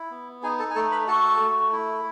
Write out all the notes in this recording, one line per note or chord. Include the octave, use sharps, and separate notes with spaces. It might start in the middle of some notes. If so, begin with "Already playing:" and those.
Already playing: E4
B3
D#4 G#4 G#5
A4 A5
G#5
A3 A4 A5
B4 B5
F#4 A4 A5
A3
E4